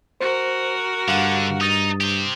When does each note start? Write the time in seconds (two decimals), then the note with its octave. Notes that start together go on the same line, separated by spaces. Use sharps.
0.20 F#4 A#4 C5
1.08 G2 D3 F5 F#5
1.61 D#4 D#6 A6
2.01 G4 C5